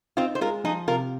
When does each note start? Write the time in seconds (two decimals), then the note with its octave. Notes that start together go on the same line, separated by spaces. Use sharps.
0.17 C4 D#4 F4
0.35 C5
0.41 G#3 F4 A#4
0.64 F3 D#4 G#4
0.88 C3 F4 A#4